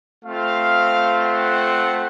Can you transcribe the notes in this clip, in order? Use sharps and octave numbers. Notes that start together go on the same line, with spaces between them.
A3 C4 F4 F5
F#5